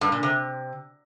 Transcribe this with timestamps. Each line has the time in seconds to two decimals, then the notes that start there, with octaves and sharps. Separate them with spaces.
0.01 G2
0.12 A#2
0.23 C3